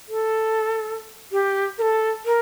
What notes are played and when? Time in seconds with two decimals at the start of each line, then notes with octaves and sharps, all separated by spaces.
0.08 A4
1.32 G4
1.78 A#4
1.82 A4
2.25 A#4